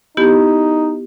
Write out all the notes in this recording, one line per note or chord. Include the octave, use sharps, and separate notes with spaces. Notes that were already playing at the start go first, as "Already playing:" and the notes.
B3 D#4 E4 G4